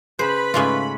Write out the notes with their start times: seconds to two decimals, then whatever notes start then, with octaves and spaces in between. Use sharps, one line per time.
0.19 C#3 B4 C5 B5
0.54 G#2 C#3 A3 C#4 F4